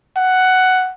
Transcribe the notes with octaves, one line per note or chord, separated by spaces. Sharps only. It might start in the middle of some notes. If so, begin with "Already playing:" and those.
F#5